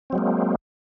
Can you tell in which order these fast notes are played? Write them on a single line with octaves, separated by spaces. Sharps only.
C4 F#3 G#3 A#3